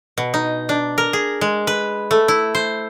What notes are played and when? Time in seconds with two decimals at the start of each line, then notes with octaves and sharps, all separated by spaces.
0.18 B2
0.34 D#4
0.69 D4
0.98 A#4
1.13 G#4
1.41 G#3
1.67 B4
2.11 A3
2.28 E4
2.55 C5